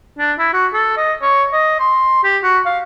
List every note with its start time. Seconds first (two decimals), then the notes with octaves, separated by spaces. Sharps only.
0.19 D4
0.39 E4
0.53 F#4
0.73 A4
0.97 D#5
1.22 C#5
1.53 D#5
1.79 C6
2.24 G4
2.43 F#4
2.65 F5